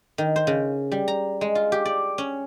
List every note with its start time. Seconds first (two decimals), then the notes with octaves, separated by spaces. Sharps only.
0.18 D#3
0.36 C5
0.47 C#3
0.92 G3
1.08 A#5
1.41 G#3
1.55 F4
1.72 G4
1.85 D5
2.18 C#4